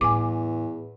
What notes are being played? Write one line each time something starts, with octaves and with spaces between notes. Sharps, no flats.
E2 A2 G3 G#5 D6